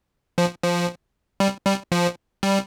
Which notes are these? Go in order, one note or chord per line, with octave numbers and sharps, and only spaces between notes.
F3
F3
G3
G3
F3
G3